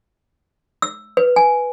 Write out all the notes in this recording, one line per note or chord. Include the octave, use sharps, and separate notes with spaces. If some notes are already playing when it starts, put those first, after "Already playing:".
E6
B4
G#5